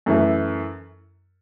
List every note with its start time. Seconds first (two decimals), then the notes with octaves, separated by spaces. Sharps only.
0.06 F#2 E3 A3 E4